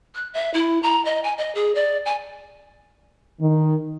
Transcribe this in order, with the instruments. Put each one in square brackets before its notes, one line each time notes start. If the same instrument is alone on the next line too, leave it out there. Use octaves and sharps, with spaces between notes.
[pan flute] F#6
E5
E4
A#5
D#5
G#5
D#5
G#4
D5
G#5
[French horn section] D#3